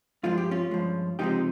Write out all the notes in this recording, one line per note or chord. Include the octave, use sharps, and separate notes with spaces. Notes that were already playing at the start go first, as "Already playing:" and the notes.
G2 F3 G#3 F4
G4
C#4 F4
G2 F3 G#3
C#2 C3 F3 G#3 D#4 G4